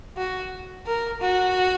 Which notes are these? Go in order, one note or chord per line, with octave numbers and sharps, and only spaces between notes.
F#4
A#4
F#4